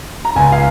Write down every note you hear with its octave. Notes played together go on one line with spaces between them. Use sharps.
A#5
C#2 G#5
F5